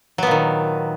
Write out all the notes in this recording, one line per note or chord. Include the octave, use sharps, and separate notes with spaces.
A#2 D#3 F#3 B3